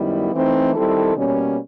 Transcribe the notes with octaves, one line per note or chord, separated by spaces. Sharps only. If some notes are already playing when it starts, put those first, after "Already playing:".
Already playing: F#2 D#3 G3 B3 E4
E3 A3 C4 D#4
D#3 G3 C4 E4 A4
B2 G3 A#3 C#4